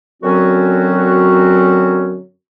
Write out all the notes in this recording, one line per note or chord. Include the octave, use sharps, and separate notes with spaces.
F#2 D3 F#3 C4 C#4 F#4